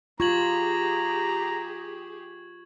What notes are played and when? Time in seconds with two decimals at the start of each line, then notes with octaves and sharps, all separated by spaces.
0.20 F4 G4 G#4 A#5 C#6 G#6 F#7